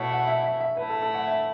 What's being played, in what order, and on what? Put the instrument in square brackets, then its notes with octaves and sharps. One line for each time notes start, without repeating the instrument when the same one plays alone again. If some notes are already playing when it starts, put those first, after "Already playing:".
Already playing: [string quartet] B2 A3 E4 [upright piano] C#5
[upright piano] F#5
E5
E5
E5
[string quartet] A2 A3 E4 [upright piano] B4
[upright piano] A4
A4
F#5
E5